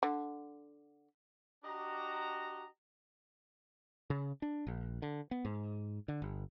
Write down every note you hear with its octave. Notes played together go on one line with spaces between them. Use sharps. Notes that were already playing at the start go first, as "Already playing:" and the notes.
D3
D4 F#4 G4 D#5 A#5
C#3
D4
A#1
D3
B3
G#2
D3
G1